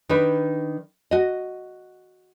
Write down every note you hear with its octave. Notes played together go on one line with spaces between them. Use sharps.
D#3 D4 B4
F#4 D#5